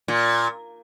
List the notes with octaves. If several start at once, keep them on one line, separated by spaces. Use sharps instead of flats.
A#2